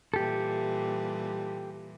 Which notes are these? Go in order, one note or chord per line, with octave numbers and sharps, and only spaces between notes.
A#2 E3 G3 G4 A4